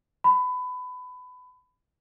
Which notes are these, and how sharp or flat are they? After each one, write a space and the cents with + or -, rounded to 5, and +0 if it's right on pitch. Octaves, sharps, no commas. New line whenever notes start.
B5 +25